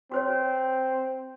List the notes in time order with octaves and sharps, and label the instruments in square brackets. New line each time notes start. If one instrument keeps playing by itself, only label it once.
[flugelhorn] C4 [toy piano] F#4 C5 C#5